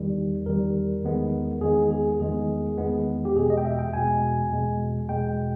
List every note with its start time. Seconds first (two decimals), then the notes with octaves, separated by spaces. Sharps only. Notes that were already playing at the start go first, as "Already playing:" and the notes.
Already playing: E2 D#3 G3
0.46 E2 D#3 G3 A#4
1.03 E2 D#3 G#3 B3
1.61 E2 D#3 G#3 B3 G#4
1.91 G#4
2.20 E2 D#3 G#3 B3 G#4
2.78 E2 D#3 G#3 B3
3.25 G4
3.36 E2 B2 G#3 G#4
3.50 D#5
3.57 G5
3.65 E5
3.79 G5
3.93 E2 B2 G#3 G#5
4.51 E2 B2 G#3
5.09 E2 B2 G#3 G5